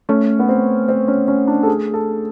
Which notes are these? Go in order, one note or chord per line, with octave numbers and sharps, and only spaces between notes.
A3 C#4
B3
C4
C4
C#4
C#4
D4
A4
G#4
A4